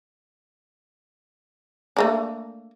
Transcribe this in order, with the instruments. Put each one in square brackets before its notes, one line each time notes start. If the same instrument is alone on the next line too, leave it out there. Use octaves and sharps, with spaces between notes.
[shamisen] A3 A#3 D4